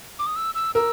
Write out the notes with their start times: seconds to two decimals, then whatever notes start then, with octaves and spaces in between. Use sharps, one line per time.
0.19 D6
0.27 D#6
0.36 E6
0.55 E6
0.75 A#4 E6